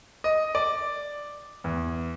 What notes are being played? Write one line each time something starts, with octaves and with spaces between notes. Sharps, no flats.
D#5
D5
E2